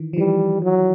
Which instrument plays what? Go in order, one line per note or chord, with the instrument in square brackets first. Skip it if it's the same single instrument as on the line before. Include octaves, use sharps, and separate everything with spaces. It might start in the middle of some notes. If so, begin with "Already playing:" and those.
Already playing: [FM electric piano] D#3 E3
F3
[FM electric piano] E3 [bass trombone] G3
[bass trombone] F#3